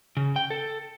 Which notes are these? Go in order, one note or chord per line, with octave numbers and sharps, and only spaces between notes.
C#3
G5
A4